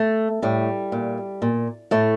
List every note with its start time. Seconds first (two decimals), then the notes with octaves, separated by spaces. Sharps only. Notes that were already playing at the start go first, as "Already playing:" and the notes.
Already playing: A3
0.43 A2 G3
0.92 A#2
1.42 A#2
1.91 A2 A3